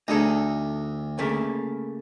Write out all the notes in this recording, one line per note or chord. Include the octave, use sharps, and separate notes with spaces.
D2 D#4 G#4 A4
C#3 A3 A#3